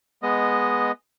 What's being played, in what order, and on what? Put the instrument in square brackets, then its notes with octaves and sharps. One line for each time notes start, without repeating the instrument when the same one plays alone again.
[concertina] G#3 B3 D#5